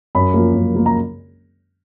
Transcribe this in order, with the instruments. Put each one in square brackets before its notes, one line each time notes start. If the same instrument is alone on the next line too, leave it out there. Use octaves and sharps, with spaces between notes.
[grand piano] F#2 B5
F3 A#3
F#2
F3 A#3
A#5